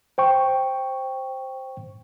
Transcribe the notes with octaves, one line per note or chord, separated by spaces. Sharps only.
C5 G5 C#6